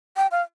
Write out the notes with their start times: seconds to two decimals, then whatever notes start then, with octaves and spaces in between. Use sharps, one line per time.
0.17 G5
0.31 F5